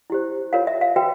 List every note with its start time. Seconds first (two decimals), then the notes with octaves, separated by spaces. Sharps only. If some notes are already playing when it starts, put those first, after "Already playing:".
0.10 E4 G4 C5
0.53 F4 A#4 C#5 F5
0.67 E5
0.81 F5
0.96 F#4 B4 G5